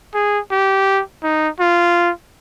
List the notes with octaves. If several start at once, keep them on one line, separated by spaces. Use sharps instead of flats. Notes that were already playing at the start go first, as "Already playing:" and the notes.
G#4
G4
D#4
F4